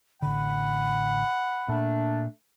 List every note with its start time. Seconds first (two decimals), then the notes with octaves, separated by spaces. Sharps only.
0.22 A1 D3 F#5 B5
1.68 A#2 A3 D4